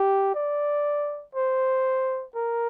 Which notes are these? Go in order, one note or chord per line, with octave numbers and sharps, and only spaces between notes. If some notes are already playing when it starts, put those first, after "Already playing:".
Already playing: G4
D5
C5
A#4